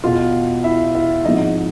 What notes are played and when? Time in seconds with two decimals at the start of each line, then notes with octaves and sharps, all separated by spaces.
0.04 E2 B2 F4 F5
0.64 E4 E5
0.95 E4 E5
1.25 G#1 G#2 F3 D#4 D#5